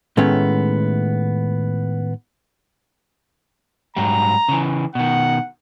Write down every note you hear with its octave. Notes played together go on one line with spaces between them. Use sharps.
A2 D#3 G#3 A3 B3 C#4
G#2 F#3 G3 A#5
C#3 E3
B2 D#3 F#5